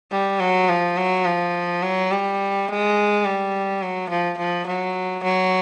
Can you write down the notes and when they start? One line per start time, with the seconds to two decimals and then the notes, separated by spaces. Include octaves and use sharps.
0.12 G3
0.40 F#3
0.69 F3
0.98 F#3
1.26 F3
1.83 F#3
2.12 G3
2.68 G#3
3.25 G3
3.82 F#3
4.10 F3
4.38 F3
4.67 F#3
5.24 F#3